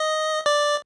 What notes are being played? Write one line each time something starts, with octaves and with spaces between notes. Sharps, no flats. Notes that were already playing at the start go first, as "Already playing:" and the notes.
Already playing: D#5
D5